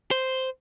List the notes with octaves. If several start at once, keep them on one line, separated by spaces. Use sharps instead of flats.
C5